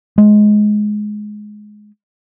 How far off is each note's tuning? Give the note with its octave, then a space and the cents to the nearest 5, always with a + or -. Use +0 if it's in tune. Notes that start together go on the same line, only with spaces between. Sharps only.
G#3 +15